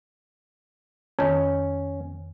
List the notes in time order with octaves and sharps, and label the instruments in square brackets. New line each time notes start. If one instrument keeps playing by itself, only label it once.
[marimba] F2 D#3 [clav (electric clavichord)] C#4